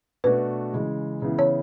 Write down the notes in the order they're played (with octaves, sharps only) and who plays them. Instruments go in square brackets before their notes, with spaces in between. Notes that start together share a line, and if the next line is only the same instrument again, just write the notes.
[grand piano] B2 A3 D4 F#4 [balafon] B4
[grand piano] C#3 E3 G#3
C#3 E3 B3 E4
[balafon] C#5